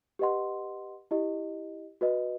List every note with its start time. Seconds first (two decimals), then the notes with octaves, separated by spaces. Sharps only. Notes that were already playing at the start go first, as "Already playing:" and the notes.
0.19 G4 B4 D#5 F#5 C6
1.11 E4 G4 D#5
2.01 F#4 B4 D#5